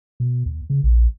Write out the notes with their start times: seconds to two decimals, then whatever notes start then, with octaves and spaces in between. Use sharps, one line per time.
0.20 B2
0.46 D#2
0.70 C#3
0.83 A#1